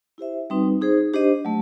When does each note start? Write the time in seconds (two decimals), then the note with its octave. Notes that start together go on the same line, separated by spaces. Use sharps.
0.18 E4 G4 C5 E5
0.50 G3 C4 D#4 F#4 B4
0.82 D#4 G#4 C5
1.13 D4 G4 C5 D#5
1.45 F#3 A3